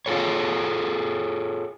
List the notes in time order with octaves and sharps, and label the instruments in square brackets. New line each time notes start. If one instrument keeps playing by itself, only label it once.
[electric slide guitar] F4 G#4 A4 C#5